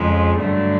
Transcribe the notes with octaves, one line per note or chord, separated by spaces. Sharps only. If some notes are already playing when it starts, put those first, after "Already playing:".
Already playing: F2 C#3 F3 G#3
G2 D3 F#3 A3